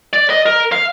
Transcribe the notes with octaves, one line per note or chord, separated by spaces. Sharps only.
D5
D#5
A#4
F5